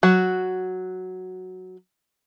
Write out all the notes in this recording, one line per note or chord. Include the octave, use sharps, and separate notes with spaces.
F#3 F#4